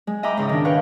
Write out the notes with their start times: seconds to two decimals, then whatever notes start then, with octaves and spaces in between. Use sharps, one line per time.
0.07 G#3
0.23 D#5 E5 G5 A#5 B5 D6
0.37 G#2 C#3 D#5 D#6
0.49 D#3 D4
0.64 A#4 B4 C#5 F5 G5